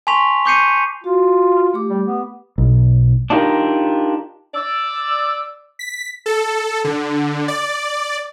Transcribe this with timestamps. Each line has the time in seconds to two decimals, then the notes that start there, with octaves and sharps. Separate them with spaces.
0.07 G#5 A5 C6 C#6 B6 F7
0.45 C#6 D6 G6 C7 C#7 D#7
1.04 F4 F#4
1.74 A3 G4 D6
1.90 G3
2.05 B3
2.58 B1
3.30 D4 D#4 F4 G4 A#4
4.55 D5 E6
5.79 B6
6.26 A4
6.84 D3
7.48 D5